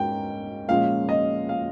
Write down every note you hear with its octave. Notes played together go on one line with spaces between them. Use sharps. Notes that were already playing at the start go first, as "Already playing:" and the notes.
Already playing: G#2 A#3 C#4 G5
A#2 F3 G#3 C#4 F5
D#5
F5